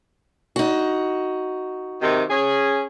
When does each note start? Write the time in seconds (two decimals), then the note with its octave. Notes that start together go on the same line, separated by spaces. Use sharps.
0.56 D#4 F#4
2.02 C3 D#3
2.30 C#4 G#4